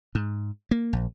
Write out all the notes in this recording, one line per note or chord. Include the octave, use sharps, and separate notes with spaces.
G#2
A#3
A#1